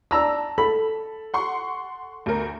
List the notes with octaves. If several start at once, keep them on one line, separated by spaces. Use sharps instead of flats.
D4 A5 A#5 E6
A4 B5
F#5 C6 C#6
D2 A#4